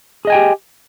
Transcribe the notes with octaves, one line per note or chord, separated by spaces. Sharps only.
G4 G#4 D#5 G5 G#5